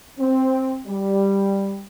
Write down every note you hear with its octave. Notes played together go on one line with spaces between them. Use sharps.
C4
G3